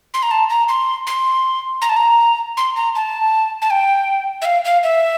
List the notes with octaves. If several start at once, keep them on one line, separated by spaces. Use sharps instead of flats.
C6
A#5
A5
A#5
C6
C6
A#5
A5
A#5
C6
A#5
A5
A5
G5
E5
F5
F5
E5